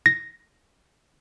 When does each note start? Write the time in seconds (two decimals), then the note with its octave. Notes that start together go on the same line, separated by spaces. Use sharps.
0.06 A#6